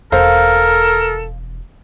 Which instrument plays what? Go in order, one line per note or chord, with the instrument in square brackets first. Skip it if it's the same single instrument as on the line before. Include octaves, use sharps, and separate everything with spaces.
[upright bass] E1 [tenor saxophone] A4 [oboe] A#4 [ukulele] C5 F5